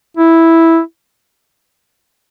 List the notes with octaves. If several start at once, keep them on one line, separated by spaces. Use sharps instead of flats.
E4